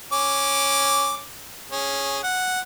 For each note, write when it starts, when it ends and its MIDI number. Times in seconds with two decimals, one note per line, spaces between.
0.12 1.25 61
0.12 1.25 86
1.72 2.20 61
1.72 2.20 68
2.23 2.60 78